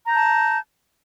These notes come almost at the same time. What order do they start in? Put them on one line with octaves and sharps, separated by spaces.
A#5 G6 A5